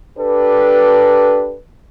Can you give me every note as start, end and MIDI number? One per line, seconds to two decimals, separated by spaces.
0.18 1.58 62
0.18 1.58 67
0.18 1.58 69
0.18 1.58 71